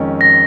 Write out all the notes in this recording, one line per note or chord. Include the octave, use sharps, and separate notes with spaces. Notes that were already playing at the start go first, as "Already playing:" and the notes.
Already playing: F2 D#3 G#3 C#4
A#6